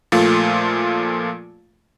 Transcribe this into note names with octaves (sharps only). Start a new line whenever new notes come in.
A#2 F3 A3 F4